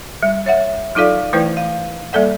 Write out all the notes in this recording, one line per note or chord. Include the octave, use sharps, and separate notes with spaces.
G3
C#5 E5 F#5
F#3 D#4 F4 A4 D5 F5
E3 A3 E4 B4 C5
F5
G3 A#3 A4 D5 F#5